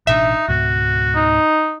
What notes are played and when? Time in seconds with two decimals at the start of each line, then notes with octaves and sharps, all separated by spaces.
0.07 A1 B2 D4 D#4 E5
0.48 C#2 G#2 B2 F#4
1.16 D#4